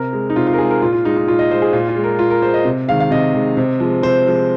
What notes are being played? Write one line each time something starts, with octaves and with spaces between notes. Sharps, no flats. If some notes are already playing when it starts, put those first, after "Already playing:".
Already playing: C3 A#4
G#3
D#4
C3 F4
F4
A#4
G#3 G#4
A#4
A#2 F4
F4
G#3 D#4
D#4
A#2 F4
D#5
G#3 C5
G#4
A#2 F4
F4
G#3
A#4
A#2 F4
A#4
G#3 C5
D#5
C3
D#3 G#3 F5
F5
C3 D#5
D#3 G#3
C3
F3 G#3
C3 C5
F3 G#3